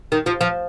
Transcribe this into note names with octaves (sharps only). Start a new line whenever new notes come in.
D#3
F3
F3